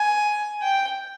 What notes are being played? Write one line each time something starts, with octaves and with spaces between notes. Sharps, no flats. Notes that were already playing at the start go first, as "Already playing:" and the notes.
Already playing: G#5
G5